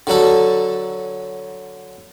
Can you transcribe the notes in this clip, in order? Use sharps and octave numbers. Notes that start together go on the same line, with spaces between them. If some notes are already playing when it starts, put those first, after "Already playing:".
D3 F#3 F#4 A4